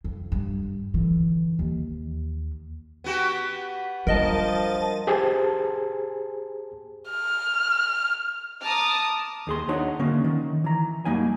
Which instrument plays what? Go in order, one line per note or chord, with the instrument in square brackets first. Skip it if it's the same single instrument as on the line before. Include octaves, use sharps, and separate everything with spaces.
[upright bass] F2
G2
D3 E3
D#2
[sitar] B3 F#4 G4
[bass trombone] F3 [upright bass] G3 D4 [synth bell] A#4 D#5 A5
[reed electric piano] G4 G#4 C5 G#5 A5
[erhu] F6
[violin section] A5 A#5 D6 D#6 F6
[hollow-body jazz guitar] D#2 G#4 C6
D4 D#4 F#4 C#5 D#5
D3 A#3 C#4
D#3
E3 A#5
F#2 G3 A#3 D#4 G#5